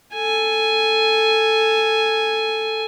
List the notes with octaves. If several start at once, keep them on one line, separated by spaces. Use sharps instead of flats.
A4 G#5